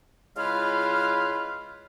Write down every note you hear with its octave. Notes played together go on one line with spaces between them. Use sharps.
C#3 G#3 E4 F4 B4 F6